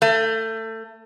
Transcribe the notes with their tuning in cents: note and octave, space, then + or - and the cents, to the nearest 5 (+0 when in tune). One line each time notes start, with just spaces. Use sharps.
A3 +25